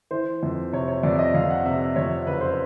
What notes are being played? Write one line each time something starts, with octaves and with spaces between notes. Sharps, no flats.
E3 C5
F2
C3 C#5
C#5
F2 D5
D#5
F2 F5
F#5
C3 E5
F2 C#5
F#1 B4
C5